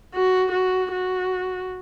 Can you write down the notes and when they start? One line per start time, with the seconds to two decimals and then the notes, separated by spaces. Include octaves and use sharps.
0.15 F#4
0.52 F#4
0.92 F#4